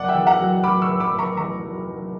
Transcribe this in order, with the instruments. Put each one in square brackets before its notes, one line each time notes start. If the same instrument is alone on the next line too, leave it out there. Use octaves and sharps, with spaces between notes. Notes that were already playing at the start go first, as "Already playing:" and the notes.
Already playing: [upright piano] F#1 D5 F#5
E5 G5
E2
F#5 A#5
F#3
F#3 B5 D6
C#6 E6
F#1
B5 D6
F#1
A#5 C#6
E2 A#5 C#6
F#3
F#1